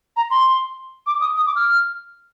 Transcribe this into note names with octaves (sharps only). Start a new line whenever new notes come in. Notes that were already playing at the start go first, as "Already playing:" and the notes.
A#5
C6
D6
D#6
D#6
D6
F6